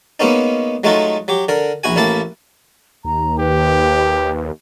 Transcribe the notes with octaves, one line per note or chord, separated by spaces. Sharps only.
G#3 A#3 B3 C#4 D#4
F#3 G#3 A3 D#4 F4 F#4
F#3 G4
D3 A#4
A#1 E4 F#4 G#5
A1 A2 A#3 E4 E5 A5
D#2 A#5
G4 B4